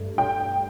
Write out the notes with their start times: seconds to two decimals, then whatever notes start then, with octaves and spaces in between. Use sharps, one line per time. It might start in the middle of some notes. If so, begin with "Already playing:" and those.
Already playing: G2 A3
0.18 G5